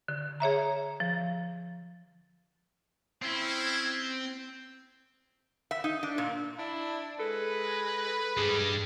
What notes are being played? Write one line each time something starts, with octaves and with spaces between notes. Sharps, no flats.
D3
G#4 C#5 E5 A#5
F3
C4 C#4 E4
E5
D#4
D4
A#2
D4 E4
G#3 A4 B4
G2 G3 G#3 G#4